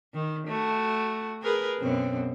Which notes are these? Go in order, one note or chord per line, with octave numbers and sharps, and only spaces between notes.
D#3
A3 F#4
G#4 A#4 B4
F#2 B2 C4